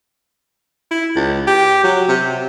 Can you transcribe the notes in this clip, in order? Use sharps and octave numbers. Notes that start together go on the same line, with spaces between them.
E4
C#2
G4
F#3
C3